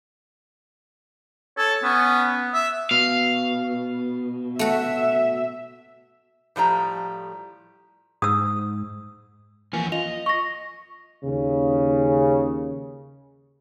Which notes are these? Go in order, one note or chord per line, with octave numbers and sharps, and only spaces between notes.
A4 C#5
B3 C#4
E5
B2 F5
A3 F#4 E5
A2 F3 G3 A#5
G#2 D#6 E6
E2 E3 F3 A#3 C#4 G#5
F4 D#5 F7
C#6 A#6
D#2 C#3